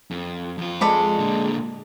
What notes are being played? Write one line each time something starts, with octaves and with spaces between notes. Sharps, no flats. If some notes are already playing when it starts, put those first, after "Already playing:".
F2
F2 F4
G#3 A4 D5 B5
A#2 D3